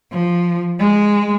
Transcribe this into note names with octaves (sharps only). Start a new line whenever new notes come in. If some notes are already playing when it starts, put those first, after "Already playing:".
F3
G#3